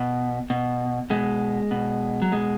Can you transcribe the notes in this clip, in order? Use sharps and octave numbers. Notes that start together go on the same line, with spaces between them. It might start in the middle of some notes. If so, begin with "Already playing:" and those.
Already playing: B2
B2
B2 G#3
B2
F#3
B2 G#3